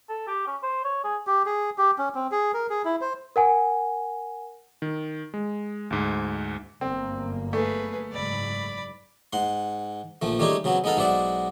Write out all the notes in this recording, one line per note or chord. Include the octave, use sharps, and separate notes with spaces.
A4
G4
C#4
C5
C#5
G#4
G4
G#4
G4
C#4
C4
G#4
A#4
G#4
E4
C5
A#4 F#5 G#5
D#3
G#3
D2 G#2
G1 F#2 A#3 C4
A3 G#4 B4
F#1 G#2 D5 B5
G#2 F#5 C6
A#1 F3 A3
G3 A3 C#4 D#4 G4 G#4
C#3 F#3 B3 C4
G#3 B3 D#4 A4 F5
B1 G#3 C5 D5 E5 F#5